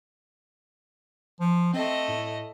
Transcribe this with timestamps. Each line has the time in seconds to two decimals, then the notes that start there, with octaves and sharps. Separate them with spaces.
1.41 F3
1.74 A3 C4 D#5
2.09 A2